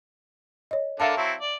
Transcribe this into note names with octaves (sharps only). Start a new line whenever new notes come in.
C#5 D#5
D3 A4 A#4 E5 F5 A5
F#3 C4 E4 A5
D5